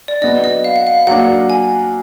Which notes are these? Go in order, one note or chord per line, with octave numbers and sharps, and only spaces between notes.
D5
F#3 B3 D4 D#5
D#5
F5
F#5
F5
F#3 A#3 D4 F#5
G#5